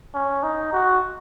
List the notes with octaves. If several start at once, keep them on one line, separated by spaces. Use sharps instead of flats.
C#4
D#4
F#4